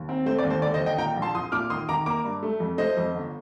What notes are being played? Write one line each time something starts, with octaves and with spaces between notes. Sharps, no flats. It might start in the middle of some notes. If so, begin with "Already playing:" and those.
Already playing: D#2
C4
A3 C5
D5
D#2
C5
D3 D5
C5 D#5
D#2
D#5 G5
A#2 G5 A#5
A#1
A5 C6
F3 C6 D#6
A#2 D6 F6
D#3 C6 D#6
D#3 A#5 D6
A#3 A#5 D6
G2
A3
F2
A3 C5 D#5
F2
G1